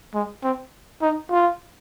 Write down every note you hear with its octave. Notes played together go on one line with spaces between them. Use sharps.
G#3
C4
D#4
F4